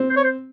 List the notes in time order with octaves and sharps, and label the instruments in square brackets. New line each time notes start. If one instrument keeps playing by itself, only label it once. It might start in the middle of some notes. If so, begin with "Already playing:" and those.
Already playing: [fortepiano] C4
[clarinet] C5
C#5
C5